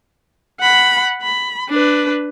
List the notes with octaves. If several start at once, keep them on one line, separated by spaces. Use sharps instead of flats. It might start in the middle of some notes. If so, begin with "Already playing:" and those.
F#5 B5
B5
D4 B4